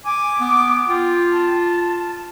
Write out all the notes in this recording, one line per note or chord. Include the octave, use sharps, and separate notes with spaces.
G#5 D6
B3
F4 G5
A5